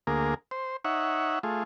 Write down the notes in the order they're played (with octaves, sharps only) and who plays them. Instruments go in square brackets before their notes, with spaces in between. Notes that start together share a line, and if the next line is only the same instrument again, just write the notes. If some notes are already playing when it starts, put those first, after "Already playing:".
[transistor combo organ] D2 A#3 G#4 A#4
C5
D#4 C#5 E5 F#5
A3 F4 G#4